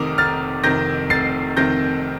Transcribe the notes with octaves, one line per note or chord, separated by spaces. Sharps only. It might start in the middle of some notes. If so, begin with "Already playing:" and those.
Already playing: F1 F2 C3 D#3 A#5 D6 D#6
F1 F6 A6
F2 C3 D#3 G6 A#6
F1 A6 C7
F2 C3 D#3 G6 A#6